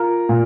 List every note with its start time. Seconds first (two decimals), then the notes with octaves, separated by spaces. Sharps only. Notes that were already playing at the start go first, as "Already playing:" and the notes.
Already playing: F4 A#4
0.29 A#2